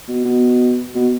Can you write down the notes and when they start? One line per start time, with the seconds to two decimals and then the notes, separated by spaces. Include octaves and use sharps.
0.08 B2
0.25 B2
0.95 B2